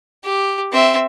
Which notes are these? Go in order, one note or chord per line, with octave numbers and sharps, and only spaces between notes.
G4
C4 E5